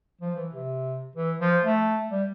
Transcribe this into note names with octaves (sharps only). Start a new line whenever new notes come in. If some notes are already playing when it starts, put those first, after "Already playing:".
F3
E3
C3
E3
F3
A3
G3